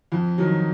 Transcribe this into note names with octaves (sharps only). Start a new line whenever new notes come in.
F2
D#3 F#3